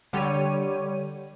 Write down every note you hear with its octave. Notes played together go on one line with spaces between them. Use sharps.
D3 G3 G4 C#5 D#7